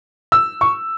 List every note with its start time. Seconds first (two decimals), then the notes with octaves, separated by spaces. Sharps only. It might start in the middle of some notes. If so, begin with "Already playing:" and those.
0.32 E6
0.61 C#6